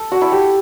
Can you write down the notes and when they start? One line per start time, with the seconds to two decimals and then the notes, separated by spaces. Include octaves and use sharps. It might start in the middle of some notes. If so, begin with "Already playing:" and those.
Already playing: A4
0.11 F#4
0.21 E4
0.32 G4